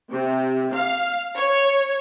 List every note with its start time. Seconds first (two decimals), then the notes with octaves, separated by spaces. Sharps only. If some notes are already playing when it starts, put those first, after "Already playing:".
0.12 C3
0.75 F5
1.35 C#5